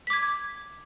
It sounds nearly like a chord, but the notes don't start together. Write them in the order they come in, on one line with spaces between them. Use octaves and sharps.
B6 D6 G#6